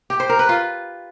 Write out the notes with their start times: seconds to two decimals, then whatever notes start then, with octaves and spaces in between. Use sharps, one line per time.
0.10 G4
0.20 C5
0.29 A#4
0.39 B4
0.49 F4